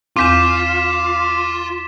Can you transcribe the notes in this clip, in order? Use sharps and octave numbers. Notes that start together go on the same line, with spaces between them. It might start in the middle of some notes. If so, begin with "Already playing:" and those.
E2 C4 F4 D6 B6 E7